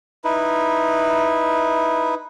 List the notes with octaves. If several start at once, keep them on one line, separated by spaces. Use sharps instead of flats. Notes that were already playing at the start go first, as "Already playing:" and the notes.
D#4 E4 B4